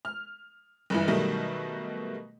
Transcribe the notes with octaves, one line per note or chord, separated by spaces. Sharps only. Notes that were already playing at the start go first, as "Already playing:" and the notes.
F6
F#1 G2 E3
B2 D#3 F#3 G3 A3